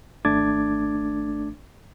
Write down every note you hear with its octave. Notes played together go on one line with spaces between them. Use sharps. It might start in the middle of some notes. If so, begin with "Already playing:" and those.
G#1 A3 D4 D6 G#6 A6